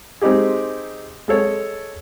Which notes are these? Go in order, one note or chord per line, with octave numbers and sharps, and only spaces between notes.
G#3 C4 D#4 G4 G#4
G#3 A4 C#5